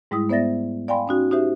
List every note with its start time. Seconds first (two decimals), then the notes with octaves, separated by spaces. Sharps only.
0.11 G#2 G3 G#3 E4 D#6
0.29 B3 C5 D5 E5 A6 A#6
0.88 D5 F5 G5 G#5 B5 C6
1.08 C#4 D#4 F#4
1.31 D#4 F#4 G4 C5 E5